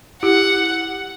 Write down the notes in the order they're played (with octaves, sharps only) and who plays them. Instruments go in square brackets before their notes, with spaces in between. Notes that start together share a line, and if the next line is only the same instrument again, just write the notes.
[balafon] E4 G4 [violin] F#5